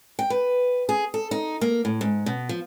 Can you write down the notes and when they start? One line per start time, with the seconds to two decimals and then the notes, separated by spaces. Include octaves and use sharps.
0.19 G5
0.30 B4
0.89 G#4
1.14 A4
1.31 D#4
1.61 A#3
1.85 A2
2.01 G#2
2.26 B2
2.49 F3